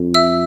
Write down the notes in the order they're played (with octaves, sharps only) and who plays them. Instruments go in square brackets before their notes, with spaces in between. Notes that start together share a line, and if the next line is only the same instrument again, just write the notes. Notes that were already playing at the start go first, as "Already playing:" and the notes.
Already playing: [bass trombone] F2
[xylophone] E5 E6